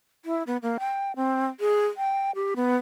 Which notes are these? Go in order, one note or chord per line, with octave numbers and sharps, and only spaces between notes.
E4
B3
A#3
G5
C4
G#4
G5
G4
B3